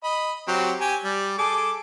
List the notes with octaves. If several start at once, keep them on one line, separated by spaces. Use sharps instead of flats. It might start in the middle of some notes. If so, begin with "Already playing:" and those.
D#5 B5
F#3 C4 G4
G4 G#5
G3
G#4 A4 D6